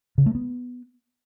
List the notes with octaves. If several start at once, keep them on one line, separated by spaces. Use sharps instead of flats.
C#3
A3
B3